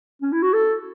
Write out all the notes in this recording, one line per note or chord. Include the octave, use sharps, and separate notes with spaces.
C#4
E4
F#4
A4